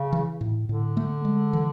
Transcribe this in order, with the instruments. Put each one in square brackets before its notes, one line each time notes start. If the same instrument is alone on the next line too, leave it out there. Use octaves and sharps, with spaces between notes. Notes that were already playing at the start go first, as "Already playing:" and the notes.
Already playing: [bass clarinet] C#3
[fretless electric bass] E3
A2
[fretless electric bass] A2 [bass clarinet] D3
[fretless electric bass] A3
G#3
E3